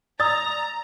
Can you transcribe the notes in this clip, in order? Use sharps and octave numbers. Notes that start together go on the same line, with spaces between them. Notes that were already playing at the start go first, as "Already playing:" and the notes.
D5 A#5 D#6 E6 A6